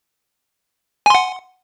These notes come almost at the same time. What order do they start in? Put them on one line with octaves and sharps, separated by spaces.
G#5 C6 F#5